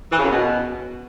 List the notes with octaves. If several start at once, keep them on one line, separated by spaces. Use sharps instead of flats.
E3
C#3
F#2
B2